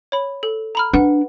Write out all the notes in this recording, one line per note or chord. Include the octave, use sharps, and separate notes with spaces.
C#5 B5
A4
A#5 B5 F6
D4 B4 F#5